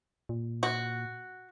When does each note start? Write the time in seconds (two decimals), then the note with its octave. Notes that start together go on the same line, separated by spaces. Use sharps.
0.29 A#2
0.63 F#4